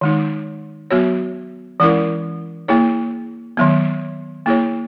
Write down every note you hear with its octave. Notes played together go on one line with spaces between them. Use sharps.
D#3 G#3 D#4
F#3 B3 F#4 C#5
E3 G#3 C#4 E4 A#4
A#3 E4 G#4 C#5
D#3 F#3 B3
A#3 E4 G#4 C#5